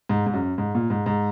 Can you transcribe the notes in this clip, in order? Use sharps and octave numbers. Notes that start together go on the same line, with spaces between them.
G#2
G#2
F#2
G#2
A#2
G#2
G#2